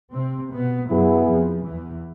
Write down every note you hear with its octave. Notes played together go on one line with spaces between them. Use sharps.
C3 C4
B2 B3
F#2 F#3 B3 E4 G#4
F2 F3
E2 E3